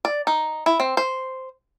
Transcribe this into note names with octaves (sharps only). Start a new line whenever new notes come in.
D5
D#4
E4
C4
C5